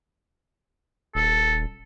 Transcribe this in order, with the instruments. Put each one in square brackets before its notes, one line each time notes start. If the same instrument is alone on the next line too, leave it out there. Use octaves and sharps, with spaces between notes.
[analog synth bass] D#1 [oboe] A4